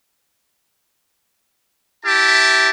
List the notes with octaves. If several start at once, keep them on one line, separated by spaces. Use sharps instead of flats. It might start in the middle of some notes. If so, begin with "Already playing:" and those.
E4 G4 E5 A5